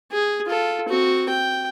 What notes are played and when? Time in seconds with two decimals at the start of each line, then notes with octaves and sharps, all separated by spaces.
0.12 G#4
0.47 F4 A4
0.89 C4 F#4
1.30 G5